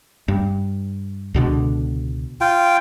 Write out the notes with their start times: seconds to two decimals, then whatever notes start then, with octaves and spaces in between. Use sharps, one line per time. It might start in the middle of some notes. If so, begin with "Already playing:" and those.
0.28 G2
1.34 C#2 B2 D3
2.41 F4 G5